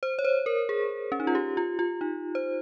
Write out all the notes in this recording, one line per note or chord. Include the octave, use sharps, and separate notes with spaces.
C5
C#5
C5
A#4
G#4
C#4
D#4
F4
G4
F4
F4
D#4
C5